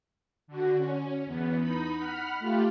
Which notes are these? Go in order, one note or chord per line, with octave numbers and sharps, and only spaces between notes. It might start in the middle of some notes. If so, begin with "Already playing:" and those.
D3 F#4
C#4
E2 B3
D#4 B5
F#5 B5 F6
A3 F4 G4